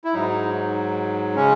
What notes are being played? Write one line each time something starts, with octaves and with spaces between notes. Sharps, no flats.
E4
G#2 F#3 D#4
C#3 G#3 C#4